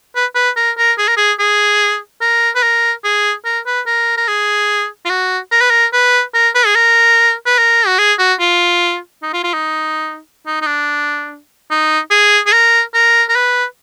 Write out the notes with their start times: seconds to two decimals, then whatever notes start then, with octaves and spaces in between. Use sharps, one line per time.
0.16 B4
0.35 B4
0.56 A#4
0.78 A#4
0.98 G#4
1.08 A#4
1.17 G#4
1.39 G#4
2.21 A#4
2.55 B4
2.63 A#4
3.04 G#4
3.45 A#4
3.66 B4
3.86 A#4
4.17 A#4
4.28 G#4
5.05 F4
5.10 F#4
5.52 A#4
5.61 B4
5.70 A#4
5.93 B4
6.34 A#4
6.55 B4
6.66 G#4
6.75 A#4
7.46 B4
7.58 A#4
7.87 F#4
7.99 G#4
8.19 F#4
8.40 F4
9.23 D#4
9.33 F4
9.43 F4
9.53 D#4
10.46 D#4
10.62 D#4
10.66 D4
11.70 D#4
12.11 G#4
12.46 G#4
12.53 A#4
12.94 A#4
13.29 A#4
13.36 B4